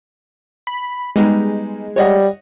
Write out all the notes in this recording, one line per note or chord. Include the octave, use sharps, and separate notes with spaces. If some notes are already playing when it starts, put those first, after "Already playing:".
B5
G3 G#3 B3 D#4
G3 C#5 D#5 F#5